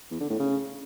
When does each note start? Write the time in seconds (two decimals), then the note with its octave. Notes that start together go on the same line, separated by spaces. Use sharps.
0.11 E2
0.20 D3
0.30 A2
0.39 C#3